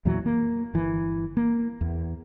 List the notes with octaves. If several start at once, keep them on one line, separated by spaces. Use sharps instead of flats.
E2 A#2 E3 F#3
A#3
G1 E3
A#3
E2